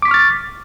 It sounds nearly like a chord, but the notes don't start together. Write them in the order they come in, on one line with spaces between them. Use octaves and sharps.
D6 B6 C#6 F6 A6